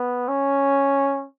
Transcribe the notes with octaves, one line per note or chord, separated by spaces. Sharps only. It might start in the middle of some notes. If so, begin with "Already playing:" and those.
Already playing: B3
C#4